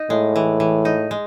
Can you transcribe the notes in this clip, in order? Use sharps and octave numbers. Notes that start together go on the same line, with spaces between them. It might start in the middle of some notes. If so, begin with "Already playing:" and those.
Already playing: D#4
A2 G#3
E3
E3
D#4
G#3